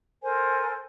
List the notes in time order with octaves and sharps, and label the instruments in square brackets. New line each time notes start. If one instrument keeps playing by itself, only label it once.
[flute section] A4 A#4 C5 G#5